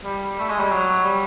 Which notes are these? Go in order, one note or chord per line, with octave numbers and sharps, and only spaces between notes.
G3
A3
G#3
G3
F#3
G3